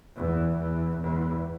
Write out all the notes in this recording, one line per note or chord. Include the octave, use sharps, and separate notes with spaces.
E2
E2
E2